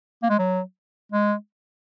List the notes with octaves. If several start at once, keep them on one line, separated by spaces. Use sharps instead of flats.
A#3
G#3
F#3
G#3